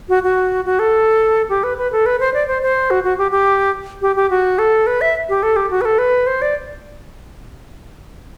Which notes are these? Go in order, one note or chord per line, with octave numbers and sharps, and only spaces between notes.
F#4
F#4
F#4
A4
G4
B4
B4
A4
B4
C5
D5
C5
C5
F#4
F#4
G4
G4
G4
G4
F#4
A4
B4
E5
G4
A4
G4
F#4
B4
A4
B4
C5
D5